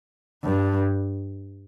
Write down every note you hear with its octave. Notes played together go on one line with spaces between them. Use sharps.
G2